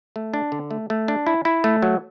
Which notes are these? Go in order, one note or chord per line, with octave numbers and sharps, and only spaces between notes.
A3
D4
D3
A3
A3
D4
E4
E4
A3
F#3